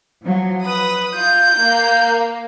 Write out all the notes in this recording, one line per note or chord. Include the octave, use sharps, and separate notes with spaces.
F3 F#3
B4 D#6
F4 G6
A#3